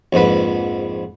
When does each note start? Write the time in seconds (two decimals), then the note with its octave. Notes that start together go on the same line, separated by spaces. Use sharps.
0.13 A#1 F2 G#2 B4